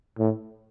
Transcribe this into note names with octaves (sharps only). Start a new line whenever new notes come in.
A2